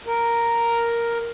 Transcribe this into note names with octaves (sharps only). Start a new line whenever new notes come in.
A#4